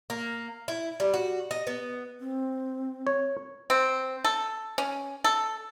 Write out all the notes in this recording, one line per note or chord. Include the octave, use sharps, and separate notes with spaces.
A#3
E4
G3
F#4
D#5
B3
C4
C#5
C4
A4
C#4
A4